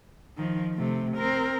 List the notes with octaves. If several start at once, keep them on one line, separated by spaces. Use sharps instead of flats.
D#3 F3
C3 A3
C4 A#4